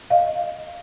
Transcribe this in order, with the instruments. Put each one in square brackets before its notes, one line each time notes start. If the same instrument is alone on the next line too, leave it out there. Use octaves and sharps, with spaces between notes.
[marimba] D#5 F5